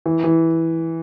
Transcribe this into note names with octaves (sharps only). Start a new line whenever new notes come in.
E3
E3